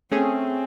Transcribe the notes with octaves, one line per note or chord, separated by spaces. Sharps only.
A3 C4 C#4 G#4